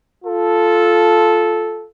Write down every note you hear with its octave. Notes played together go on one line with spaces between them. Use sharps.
F4 A4